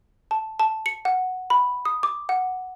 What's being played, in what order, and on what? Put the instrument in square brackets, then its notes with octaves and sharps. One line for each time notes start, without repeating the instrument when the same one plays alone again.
[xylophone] A5
A5
C#7
F#5
B5
D#6
D6
F#5